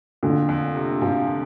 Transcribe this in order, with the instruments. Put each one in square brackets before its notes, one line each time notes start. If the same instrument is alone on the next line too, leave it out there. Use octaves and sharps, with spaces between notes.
[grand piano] F2 [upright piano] A#2 D3
[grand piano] F2
C3
[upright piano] A#2 [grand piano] F3